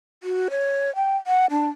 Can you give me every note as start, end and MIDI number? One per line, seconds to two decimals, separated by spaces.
0.23 0.48 66
0.51 0.94 73
0.96 1.17 79
1.27 1.46 78
1.50 1.70 62